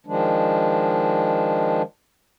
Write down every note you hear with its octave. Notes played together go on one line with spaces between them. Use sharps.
D#3 F3 G#3 D4